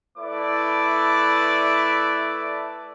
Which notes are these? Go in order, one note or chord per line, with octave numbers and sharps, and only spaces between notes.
A3 E4 B4 D5 D6